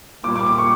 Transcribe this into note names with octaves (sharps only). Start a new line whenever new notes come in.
A#2 G3 A#3 D6
D6
D6
C#6